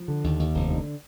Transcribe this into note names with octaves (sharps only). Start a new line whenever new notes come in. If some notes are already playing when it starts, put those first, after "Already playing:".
Already playing: F3
D3
D#2
D#2
F1
D3